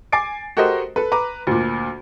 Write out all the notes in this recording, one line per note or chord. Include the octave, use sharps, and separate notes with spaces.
G#5 D6 A6 C7 D7
F#4 G4 A4 A#4 C5 D#5
A4 B4
B4 A#5 D6
D2 A#2